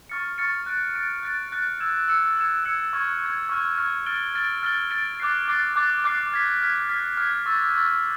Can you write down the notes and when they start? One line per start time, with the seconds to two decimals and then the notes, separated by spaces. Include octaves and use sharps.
0.09 C#6 F6 A6 C#7
0.38 C#6 F6 A6 C#7
0.66 F#6 A6 D7
0.95 F#6 A6 D7
1.23 F#6 A6 D7
1.52 F#6 A6 D7
1.80 E6 G#6 C#7 E7
2.08 E6 G#6 C#7 E7
2.36 E6 G#6 C#7 E7
2.65 E6 G#6 C#7 E7
2.93 C#6 F6 G#6
3.22 C#6 F6 G#6
3.49 C#6 F6 G#6
3.78 C#6 F6 G#6
4.06 F6 A6 D7 G7
4.34 F6 A6 D7 G7
4.63 F6 A6 D7 G7
4.91 F6 A6 D7 G7
5.20 D6 F#6 A6 C7
5.48 D6 F#6 A6 C7
5.76 D6 F#6 A6 C7
6.04 D6 F#6 A6 C7
6.32 F6 G#6 B6
6.62 F6 G#6 B6
6.89 F6 G#6 B6
7.17 F6 G#6 B6
7.46 C#6 E6 A6
7.75 C#6 E6 A6